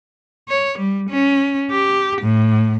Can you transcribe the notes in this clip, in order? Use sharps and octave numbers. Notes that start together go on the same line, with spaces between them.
C#5
G3
C#4
G4
A2